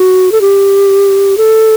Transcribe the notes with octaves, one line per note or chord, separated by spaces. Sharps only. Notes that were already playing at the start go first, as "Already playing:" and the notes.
Already playing: F#4
A4
G4
A4